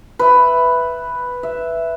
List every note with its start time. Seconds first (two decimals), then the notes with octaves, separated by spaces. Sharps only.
0.19 B4 E5
1.43 E5